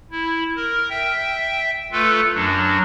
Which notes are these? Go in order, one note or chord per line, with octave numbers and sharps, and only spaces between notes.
E4
A#4
E5 G5
A3 F4 A4 B4
F#2 F#3 D4